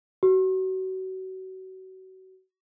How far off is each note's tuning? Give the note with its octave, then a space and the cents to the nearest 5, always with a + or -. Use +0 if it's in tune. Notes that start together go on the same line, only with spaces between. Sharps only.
F#4 +30